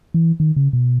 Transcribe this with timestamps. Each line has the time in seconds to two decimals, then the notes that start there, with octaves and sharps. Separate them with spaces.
0.14 E3
0.40 D#3
0.56 C#3
0.73 B2